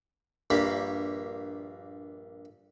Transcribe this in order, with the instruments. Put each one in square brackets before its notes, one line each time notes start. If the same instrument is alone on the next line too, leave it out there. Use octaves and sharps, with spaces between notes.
[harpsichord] A#1 G2 A#3 G4 B5